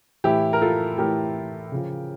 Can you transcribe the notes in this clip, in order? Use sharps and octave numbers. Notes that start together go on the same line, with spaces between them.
A2 E3 E4 G4
A#4
F4 A4
A2 E3 G4 A#4
C#3 F3